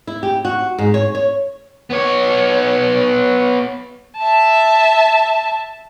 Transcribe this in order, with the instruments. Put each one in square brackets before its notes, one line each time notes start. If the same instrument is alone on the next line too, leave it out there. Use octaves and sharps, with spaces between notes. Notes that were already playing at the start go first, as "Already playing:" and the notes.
[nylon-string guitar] E4
G4
F#4
G#2
C#5
C#5
[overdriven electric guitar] B3 C#5
[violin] E5 A5